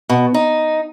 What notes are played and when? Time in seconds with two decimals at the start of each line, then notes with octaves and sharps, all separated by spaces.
0.10 B2
0.34 D#4